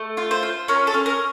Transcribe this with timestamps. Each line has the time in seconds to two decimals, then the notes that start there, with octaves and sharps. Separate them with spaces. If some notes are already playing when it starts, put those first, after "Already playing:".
Already playing: A3
0.17 F4
0.31 C5
0.43 F4
0.68 C#4 A#4
0.87 A4
0.94 C#4
1.06 A#4